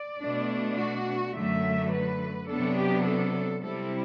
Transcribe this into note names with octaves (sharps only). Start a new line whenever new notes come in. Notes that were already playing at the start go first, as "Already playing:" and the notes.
Already playing: D5
B2 A3 D4
F#4
F#2 D3 F#3 A3 E5
B4
C3 F#3 B3 D4 A4
G4
A4
C3 G3 C4 E4 A4